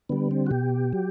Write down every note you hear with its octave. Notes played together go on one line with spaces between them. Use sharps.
D3 G3 B3
C4
F#4
B2 G4
F#3